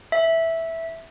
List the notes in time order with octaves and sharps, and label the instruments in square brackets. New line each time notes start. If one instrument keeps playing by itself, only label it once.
[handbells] E5